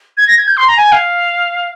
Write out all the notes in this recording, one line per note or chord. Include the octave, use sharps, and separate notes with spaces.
G#6
A#6
G#6
G6
C6
A#5
G#5
F5